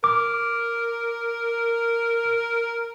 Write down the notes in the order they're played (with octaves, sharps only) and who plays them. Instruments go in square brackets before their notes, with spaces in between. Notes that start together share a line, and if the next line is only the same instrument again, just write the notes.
[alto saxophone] A#4 [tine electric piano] D6